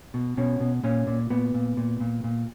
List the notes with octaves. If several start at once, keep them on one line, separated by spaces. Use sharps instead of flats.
B2
B2 C#4
B2
A#2 C#4
A#2
A#2 B3
A#2
A#2
A#2
A#2